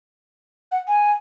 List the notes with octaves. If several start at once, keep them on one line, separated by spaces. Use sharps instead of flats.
F#5
G#5